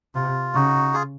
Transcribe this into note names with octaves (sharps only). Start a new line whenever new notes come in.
C3 F4
C#3 D#4 F#4
F4 G#4